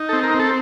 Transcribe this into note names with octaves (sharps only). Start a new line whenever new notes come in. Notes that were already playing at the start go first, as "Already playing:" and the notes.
Already playing: D#4
C4 A4
A#4
C4
A4